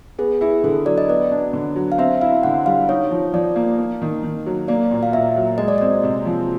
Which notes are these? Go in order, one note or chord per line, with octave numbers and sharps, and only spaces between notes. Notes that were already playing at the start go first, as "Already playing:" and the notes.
B3 G#4
E4 G#4
D3 A4
F#3 D5
D#5
B3 D5
D4
D3
F#3
F5
C4 E5
E4 F5
D3 F#5
G3 F5
D#4 C#5
F3
F3 D5
A#3
A#3
D#3
D#3
F#3
A#3 D5
A#2
F5
A#2 E5
F#3
G#3 D#5
D5
C4 D#5
C3
F3